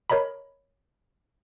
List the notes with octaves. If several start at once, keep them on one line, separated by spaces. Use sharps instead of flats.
A#4 C#5 D#5 A#5 B5